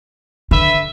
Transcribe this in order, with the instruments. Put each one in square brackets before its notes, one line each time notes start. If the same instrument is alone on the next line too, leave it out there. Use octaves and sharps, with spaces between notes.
[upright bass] D3 [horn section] B4 E5